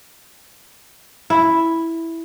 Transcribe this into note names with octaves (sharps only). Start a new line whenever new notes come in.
E4